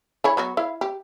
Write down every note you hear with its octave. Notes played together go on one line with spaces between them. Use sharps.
E3 C#5 B5
F#3 B3 F#4
E4 F5
G4